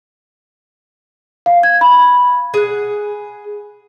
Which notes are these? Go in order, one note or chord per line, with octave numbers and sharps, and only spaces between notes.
F5
G#6
B5
G#4 F#5